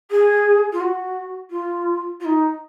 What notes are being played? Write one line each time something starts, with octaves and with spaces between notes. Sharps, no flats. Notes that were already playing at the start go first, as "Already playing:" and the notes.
G#4
F4
F#4
F4
F4
D#4